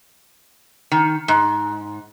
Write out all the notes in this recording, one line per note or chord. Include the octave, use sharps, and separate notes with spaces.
D#3
G#2